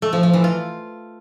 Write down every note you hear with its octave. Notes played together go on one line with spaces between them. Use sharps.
A3
F3
F3
E3
F4